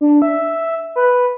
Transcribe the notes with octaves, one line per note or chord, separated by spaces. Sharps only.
D4
E5
B4